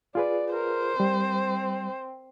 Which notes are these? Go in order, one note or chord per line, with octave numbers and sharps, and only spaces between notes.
F4 G#4 B4 D5
A#4 C5
G3 C4